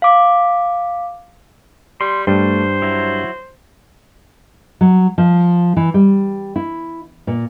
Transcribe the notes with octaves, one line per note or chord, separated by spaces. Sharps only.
F5 D6
G3 C6
G2 G3 A3 C5
F#3 E4
F#3
F3
E3
G3
E4
A#2